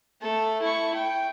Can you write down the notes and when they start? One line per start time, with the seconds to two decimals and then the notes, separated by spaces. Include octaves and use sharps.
0.22 A3 A4
0.62 E4 C#6
0.95 G5